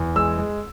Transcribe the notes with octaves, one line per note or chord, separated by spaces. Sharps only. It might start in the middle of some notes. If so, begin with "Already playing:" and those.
Already playing: E2
G#3 E6
G#3